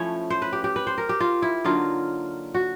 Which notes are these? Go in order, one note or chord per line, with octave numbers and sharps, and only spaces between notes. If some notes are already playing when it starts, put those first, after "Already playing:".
Already playing: F3 A3 C#4 E4 C#5
C5
B4
G4
G4
B4
C5
A#4
G4
F4
E4
D3 F#3 A#3 D#4 F4
F#4